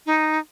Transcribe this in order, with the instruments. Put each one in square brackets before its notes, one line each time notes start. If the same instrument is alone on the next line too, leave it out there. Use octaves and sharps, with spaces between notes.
[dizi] D#4